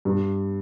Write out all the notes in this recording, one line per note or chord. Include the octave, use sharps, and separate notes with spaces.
G2